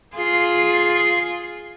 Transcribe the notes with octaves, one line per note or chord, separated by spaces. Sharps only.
F4 G#4